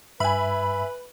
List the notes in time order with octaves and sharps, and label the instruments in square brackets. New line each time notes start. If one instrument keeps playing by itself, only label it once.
[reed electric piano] G2 [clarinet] B4 [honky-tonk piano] E5 G#5 [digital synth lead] B5